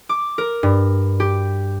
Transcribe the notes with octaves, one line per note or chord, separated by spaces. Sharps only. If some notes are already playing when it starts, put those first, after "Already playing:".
D6
A#4
G2
G4